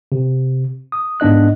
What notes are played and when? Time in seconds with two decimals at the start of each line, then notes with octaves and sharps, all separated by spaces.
0.12 C3
0.92 D#6
1.20 G#2 B3 D4 D#5 F#6